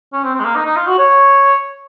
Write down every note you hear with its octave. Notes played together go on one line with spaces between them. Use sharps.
C#4
C4
C4
G#3
A#3
D#4
D#4
F4
F#4
C#5